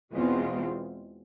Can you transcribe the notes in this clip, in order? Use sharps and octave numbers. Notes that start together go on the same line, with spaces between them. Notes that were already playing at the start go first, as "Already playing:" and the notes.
E2 B2 G#3 C4 F4